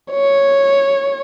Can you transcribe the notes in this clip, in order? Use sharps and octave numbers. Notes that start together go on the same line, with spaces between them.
C#5